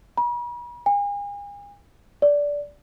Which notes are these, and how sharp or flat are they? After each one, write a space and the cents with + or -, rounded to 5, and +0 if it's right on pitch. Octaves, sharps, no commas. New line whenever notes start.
B5 -45
G#5 -40
D5 -15